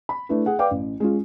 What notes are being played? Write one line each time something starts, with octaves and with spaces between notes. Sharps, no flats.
B5
A3 D4 E4 B4
G#4 F#5
B4 D5 F5 G5 D6
A1
G#3 C#4 F4